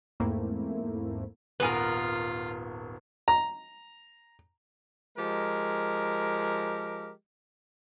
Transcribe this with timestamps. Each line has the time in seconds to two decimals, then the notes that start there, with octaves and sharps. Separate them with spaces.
0.20 E2 G#2 A3 A#3 C4 E4
1.60 D#1 G#1 B3 F4 A#4 B4 G#5
3.28 A#5
5.17 F3 G#3 G4 A#4